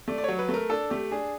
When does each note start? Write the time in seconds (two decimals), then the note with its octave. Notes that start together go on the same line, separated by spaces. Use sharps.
0.08 A3 D5
0.18 D5
0.24 F#3 C#5
0.39 B4
0.49 A3 A#4
0.70 D4 A4
0.90 A3 G4
1.11 D4 G#4